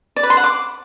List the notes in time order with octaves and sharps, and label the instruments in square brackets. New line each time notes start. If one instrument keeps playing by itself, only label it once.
[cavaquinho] D5
B4
C6
F#5
D6